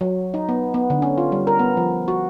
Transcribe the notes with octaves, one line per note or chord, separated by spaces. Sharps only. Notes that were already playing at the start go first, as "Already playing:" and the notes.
F#3
D#4
B3
B3
D3
C#4
F4
G3
A#4
B3
F3
F#4